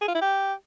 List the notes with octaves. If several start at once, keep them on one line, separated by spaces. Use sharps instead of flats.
G#4
F4
E4
G4